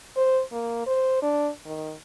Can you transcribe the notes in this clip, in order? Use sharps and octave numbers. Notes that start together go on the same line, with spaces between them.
C5
A#3
C5
D4
D#3